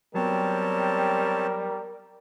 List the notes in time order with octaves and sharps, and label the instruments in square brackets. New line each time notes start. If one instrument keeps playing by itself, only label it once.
[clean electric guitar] F#3 B3 [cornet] G3 [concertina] C4 C#5 A5 [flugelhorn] A#4